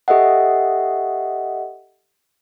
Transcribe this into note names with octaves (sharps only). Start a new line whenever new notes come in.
G4 A4 D#5 E5 F#5